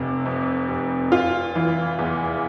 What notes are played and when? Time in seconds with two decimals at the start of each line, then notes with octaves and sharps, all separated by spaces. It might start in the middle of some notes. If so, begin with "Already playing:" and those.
Already playing: F1 C3
0.25 F2
0.68 F1
1.12 F1 F4
1.55 E3
1.99 E2